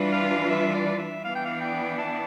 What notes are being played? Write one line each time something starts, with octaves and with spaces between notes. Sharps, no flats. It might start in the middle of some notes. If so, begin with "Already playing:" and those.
Already playing: E3 G3 D4 F4 B4
F5
E5
D5
E5
E3 B3 D4 F5
G5
F5
G5
A5